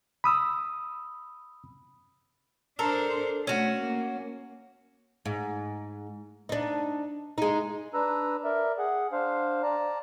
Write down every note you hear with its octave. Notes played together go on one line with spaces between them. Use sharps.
B5 D#6 E6
D4 A4 A#4 C5
A3 C#4 F#4
A#3
G#2
D4 D#4
G#3 D#4
D4 B4 A#5 E6
A#4 D5 E5
G#4 F#5
D4 C5 F5
D5 A5 A#5